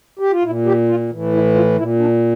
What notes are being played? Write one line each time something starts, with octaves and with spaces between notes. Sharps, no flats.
G4
F4
A#2 E4
G4
F4
A2 E3
E4
F4
A#2 E4
D4